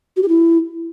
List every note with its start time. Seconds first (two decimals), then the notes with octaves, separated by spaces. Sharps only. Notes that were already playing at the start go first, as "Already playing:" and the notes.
0.16 F#4
0.22 G4
0.28 E4